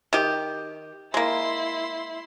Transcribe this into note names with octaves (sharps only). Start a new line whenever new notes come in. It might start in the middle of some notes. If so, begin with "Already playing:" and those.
D#3 G4
G#3 A#3 E4 C6